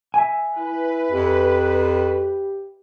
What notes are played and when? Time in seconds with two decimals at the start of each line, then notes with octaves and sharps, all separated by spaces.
0.14 E5 G#5
0.57 E4 B4
1.11 F2 G4